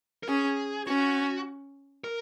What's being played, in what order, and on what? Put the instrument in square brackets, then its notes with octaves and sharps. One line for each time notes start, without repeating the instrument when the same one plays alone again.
[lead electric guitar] A#4
[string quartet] C#4 [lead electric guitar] G#4
[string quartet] C#4 [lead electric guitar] F#4
[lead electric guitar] A#4